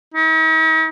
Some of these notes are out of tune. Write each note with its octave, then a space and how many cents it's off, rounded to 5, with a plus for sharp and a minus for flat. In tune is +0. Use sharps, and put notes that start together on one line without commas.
D#4 +45